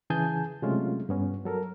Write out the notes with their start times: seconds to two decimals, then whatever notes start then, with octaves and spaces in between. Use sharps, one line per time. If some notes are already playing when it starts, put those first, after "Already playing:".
0.10 C#3 E3 G#4 G#5 A5 G6
0.62 C3 F#3 G#3 A3 C#4 F4
1.09 G2 B3 C#4
1.45 F#3 A4 A#4